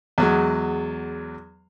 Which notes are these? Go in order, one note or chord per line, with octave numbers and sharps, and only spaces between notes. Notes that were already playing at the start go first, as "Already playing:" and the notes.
E2 F#3 G#3